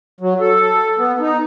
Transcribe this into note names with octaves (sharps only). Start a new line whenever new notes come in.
F#3
A4
B3
D#4